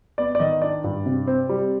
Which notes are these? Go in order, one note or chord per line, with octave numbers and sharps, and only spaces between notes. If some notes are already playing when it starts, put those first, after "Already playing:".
B3 D5
D5
D#3 D#5
D4 D5
G2
C3
C4
G3